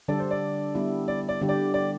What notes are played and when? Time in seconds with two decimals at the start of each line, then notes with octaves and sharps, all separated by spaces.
0.08 D3 G3 D4 A4 D5
0.20 C5
0.31 D5
0.75 G3 B3 E4
1.08 D5
1.29 D5
1.42 D3 G3 D4 G4
1.49 D5
1.74 D5